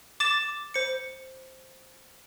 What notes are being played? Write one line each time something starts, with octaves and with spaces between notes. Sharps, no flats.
D6 A6 E7
C5 C#7